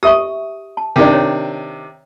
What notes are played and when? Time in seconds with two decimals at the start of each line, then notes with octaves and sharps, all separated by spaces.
0.03 G4 E5 C#6 D#6
0.77 A5
0.96 C3 D#3 D4
1.13 C#5